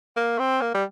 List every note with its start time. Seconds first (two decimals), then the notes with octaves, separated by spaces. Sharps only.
0.16 A#3
0.39 C4
0.62 A#3
0.74 G3